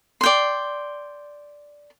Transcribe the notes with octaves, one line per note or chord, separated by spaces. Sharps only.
D5 G5 C6